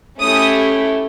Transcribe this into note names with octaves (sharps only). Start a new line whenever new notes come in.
A3 C#4 E4 G4 D#6